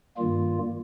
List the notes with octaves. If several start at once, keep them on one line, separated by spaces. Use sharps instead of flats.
G2 D#3 G3 A#3 F4